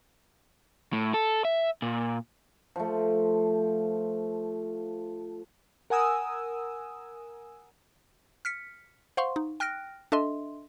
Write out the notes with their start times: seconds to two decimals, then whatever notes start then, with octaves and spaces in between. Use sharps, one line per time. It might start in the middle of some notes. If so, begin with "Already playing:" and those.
0.93 A2
1.14 A4
1.45 E5
1.82 A#2
2.76 F3 A3
5.90 A#4 F#5 G#5 D#6 E6
8.45 F6 B6 C#7
9.17 C5 F5 F#5 C6 C#6
9.36 D#4
9.60 G5 F6 F#6 A#6 D7
10.12 D4 A4 D#5 E5 C6